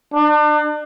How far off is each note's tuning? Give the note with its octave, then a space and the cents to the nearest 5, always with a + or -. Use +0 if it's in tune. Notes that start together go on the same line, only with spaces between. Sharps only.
D4 +40